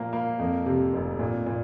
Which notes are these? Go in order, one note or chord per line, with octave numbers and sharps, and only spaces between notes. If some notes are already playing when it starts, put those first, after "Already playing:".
Already playing: A#2 F3 A#3
A#3
F2
C3
F1
A#2
A#2